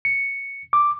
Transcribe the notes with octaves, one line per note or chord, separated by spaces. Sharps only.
C#7
D6